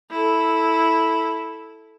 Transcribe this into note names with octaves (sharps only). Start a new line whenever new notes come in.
E4 A4